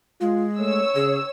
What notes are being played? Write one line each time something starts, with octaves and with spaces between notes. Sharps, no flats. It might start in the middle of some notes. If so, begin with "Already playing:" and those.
G#3 F4
A3 C#5 E6
C#3 G#4